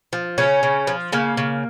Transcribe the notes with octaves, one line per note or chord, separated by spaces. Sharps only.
F3
C#3 C#4
C#3
F3
C#3 A#3
C#3